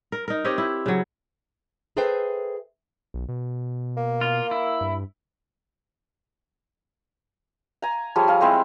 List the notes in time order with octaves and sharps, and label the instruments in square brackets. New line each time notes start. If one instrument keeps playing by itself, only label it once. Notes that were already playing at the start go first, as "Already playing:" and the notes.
[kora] A#4
D#4 A#4
C4 G4 C#5 D#5
E4
C#3 F#3
[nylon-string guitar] G#4 A4 B4 C5 E5 G5
[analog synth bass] B1
B2
[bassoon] A#3
[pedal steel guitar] F4
E4
[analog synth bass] G2
[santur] G#5 A#5
F3 G3 G#4 C#5
G#4 F5
G3 G#3 C4 E4